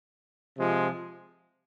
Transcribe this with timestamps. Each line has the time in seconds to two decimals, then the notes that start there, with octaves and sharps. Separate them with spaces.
0.57 C3 F3 G#3